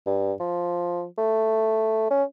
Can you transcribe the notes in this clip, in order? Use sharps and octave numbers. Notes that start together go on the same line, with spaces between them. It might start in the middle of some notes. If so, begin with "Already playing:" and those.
G2
F3
A3
C#4